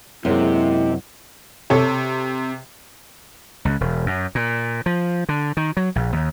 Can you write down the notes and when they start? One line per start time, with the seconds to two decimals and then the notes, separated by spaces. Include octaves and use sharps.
0.25 F#2 C3 G#3 A#3 E4
1.70 C3 A4 C#5
3.65 C#2
3.80 E1
4.06 F#2
4.35 A#2
4.86 F3
5.29 D3
5.57 D#3
5.77 F#3
5.96 A#1
6.12 D#2